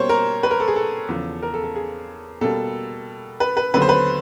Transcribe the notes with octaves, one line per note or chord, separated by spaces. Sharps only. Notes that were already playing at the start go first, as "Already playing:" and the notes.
Already playing: B2 G3 A#3 C5 C#5
A#4
B4
A#4
A4
G#4
A4
E2 C#3 F3
A#4
A4
A4
G#4
B2 G3 A#3 A4
B4
B4
D#2 D3 F#3 B3 B4
C5
B4